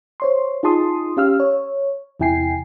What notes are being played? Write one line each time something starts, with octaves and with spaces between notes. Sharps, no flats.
C5 C#5 C6
D#4 F4 G#4 A5 C6 D#6
C#4 G4 F5 E6 F6
C#5
E2 C3 E4 G5 G#5 C7